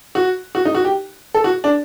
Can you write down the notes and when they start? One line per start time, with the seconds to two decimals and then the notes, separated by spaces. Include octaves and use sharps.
0.15 F#4
0.55 F#4
0.65 D#4
0.75 F#4
0.85 G4
1.34 A4
1.44 F#4
1.64 D4